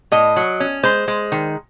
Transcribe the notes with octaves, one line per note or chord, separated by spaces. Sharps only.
A2 D#5
F#3
C#4
G#3 C5
G#3
D#3